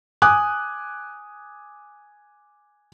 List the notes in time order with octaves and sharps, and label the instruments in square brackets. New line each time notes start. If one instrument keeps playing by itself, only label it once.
[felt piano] G#5 D6 D#6 F#6